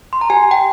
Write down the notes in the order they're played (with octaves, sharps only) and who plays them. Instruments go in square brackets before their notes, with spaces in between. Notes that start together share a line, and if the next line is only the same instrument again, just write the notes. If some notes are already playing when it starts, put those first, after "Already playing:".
[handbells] C6
A#5
G4 G#5
G5